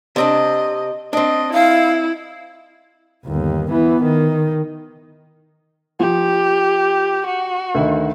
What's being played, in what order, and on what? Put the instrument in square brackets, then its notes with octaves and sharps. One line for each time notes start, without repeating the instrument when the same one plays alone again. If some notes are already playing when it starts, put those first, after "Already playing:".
[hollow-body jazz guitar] C3 C4 D4 [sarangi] D#5
[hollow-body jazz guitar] C4 D4 [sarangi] D#5
[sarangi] E4 [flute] F5
[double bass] G1 D#2
E3 B3
D#3
[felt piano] F3 [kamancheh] G4
[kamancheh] F#4
[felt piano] D2 D#3